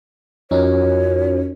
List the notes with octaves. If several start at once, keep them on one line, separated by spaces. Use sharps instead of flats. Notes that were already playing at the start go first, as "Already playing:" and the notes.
F2 C#4 D#4 F4 F#4 A#4 C#5